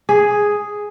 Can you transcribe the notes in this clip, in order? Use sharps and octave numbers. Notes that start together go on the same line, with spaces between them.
G#4